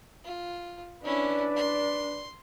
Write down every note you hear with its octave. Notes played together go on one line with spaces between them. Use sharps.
F4
C#4 D4 E4 B4 D5
C6